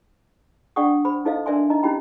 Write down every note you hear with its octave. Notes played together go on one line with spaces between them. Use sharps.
D4 D5 F#5 G5 C#6 D#6
C5 B5
D#4 E4 A4 C5 D#5 F5
D4 A#4 D5 E5 G#5 C6
D#4 D#5 A#5
C#4 D#4 E4 G4 G5 B5